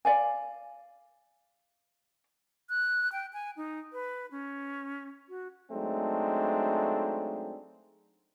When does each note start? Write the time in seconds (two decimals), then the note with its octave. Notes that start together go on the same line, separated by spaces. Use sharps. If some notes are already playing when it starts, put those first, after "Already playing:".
0.05 D5 F5 G#5
2.69 F#6
3.12 G5
3.33 G#5
3.57 D#4
3.93 B4
4.31 C#4
5.29 F#4
5.71 F#3 G#3 A3 C4 D4 D#4